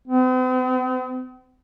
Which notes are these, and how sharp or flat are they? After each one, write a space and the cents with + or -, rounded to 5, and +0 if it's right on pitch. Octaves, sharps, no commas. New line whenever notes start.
C4 -45